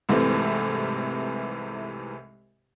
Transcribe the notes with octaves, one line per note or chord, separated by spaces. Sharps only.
C2 G#2 C3 E3 A3